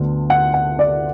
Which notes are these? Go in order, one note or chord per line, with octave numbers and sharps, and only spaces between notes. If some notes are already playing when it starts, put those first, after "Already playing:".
Already playing: D2 D3 B3
F#5
F#5
D5